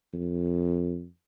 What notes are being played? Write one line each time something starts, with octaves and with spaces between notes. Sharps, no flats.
F2